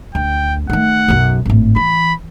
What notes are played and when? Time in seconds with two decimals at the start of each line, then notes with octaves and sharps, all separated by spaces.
0.15 D2 G5
0.70 D#3 A3 F#5
1.08 B1 F#2
1.46 G#1 A2
1.76 E3 B5